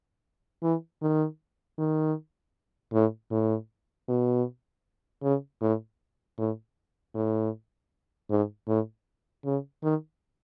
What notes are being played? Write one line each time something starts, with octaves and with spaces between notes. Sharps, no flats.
E3
D#3
D#3
A2
A2
B2
C#3
A2
A2
A2
G#2
A2
C#3
D#3